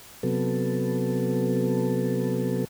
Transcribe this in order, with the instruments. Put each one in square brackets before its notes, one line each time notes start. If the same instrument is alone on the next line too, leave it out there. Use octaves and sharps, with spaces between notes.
[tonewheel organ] C3 F#3 B3 A4